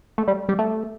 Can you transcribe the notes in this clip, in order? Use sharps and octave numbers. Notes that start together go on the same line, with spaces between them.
A3
G3
G3
A3